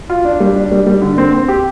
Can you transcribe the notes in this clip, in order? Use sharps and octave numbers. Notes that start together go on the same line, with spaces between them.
F4
D4
G3
D4
G3
G3
D3
C4
C4
G4